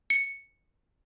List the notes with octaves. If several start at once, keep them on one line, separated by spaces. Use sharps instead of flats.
C#7